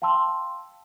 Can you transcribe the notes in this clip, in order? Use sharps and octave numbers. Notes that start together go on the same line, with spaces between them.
F5 G5 A5 C6 E6